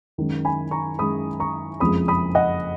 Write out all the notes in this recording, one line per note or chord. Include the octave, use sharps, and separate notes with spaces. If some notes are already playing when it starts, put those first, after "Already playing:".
F#2 D#3 G#3
G#5 B5
A#5 C#6
F#2 D#3 G#3 B5 D#6
A#5 C#6
F#1 F2 F3 G#3 B5 D#6
B5 D#6
D#5 F#5